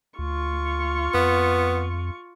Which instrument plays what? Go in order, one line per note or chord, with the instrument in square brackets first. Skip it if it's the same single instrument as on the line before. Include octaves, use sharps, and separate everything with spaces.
[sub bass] D2 [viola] F4 C#6
[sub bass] F2 [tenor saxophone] B3